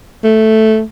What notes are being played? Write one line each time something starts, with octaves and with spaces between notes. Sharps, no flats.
A3